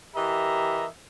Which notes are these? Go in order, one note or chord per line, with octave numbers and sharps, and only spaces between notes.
E3 G4 A#4 D#5 E5 A#5